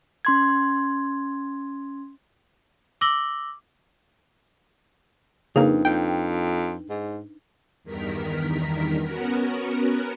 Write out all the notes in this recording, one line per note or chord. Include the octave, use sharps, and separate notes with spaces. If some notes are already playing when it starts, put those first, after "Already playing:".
C#4 C6 G#6
D6 E6 A#6 F#7 G7
F2 C#3 A#3 D4 D#4 B4
F2 G5
G#2
E2 G2 D#3 A#4 B6
B3 C#4 F#4 A#4